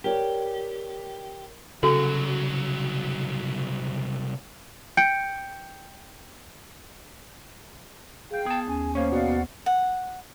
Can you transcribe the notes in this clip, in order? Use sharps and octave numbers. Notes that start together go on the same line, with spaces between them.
G4 A#4 C#5 D5
C2 C#3 F#3 F#4 A4
G5 G6 C#7 D7
G#4 F5 G5 G6
B3 G#4 A5
D#2 C#4 G#5
A#3 C#4 C5 C#5 F5
B2 D5 F5 F#5
D#2 B3
F#5